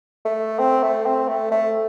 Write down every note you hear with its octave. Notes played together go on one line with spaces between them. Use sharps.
A3
C4
A3
C4
A3
A3